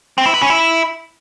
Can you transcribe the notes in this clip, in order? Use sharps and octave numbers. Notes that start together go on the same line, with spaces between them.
C4
E4
B4
C#4
E4